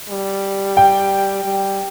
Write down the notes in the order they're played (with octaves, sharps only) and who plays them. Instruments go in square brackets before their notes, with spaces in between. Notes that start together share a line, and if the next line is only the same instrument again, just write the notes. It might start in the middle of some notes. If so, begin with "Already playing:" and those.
[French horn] G3
[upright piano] G5
[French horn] G3